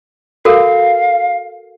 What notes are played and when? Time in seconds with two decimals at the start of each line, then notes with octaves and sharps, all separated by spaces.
0.45 F#4 A4 A#4 F5